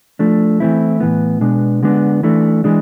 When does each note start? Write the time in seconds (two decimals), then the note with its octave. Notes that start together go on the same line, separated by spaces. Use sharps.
0.19 F3 A3 D4
0.60 E3 A3 C4 E4
1.00 A2 E3 B3
1.41 B2 G#3 B3 D4
1.83 D3 G#3 B3 D4
2.23 E3 A3 D4
2.64 E3 G#3 D4